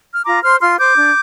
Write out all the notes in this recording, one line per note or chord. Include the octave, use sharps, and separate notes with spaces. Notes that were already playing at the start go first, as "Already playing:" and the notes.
F6
F4 A#5 D6
C5 C6 F6
F4 C6 F6
C5 D6 G6
D4